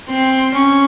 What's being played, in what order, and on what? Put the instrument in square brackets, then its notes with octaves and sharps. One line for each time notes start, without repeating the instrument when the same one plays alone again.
[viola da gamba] C4 [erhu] C6
[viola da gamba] C#4 [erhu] C#6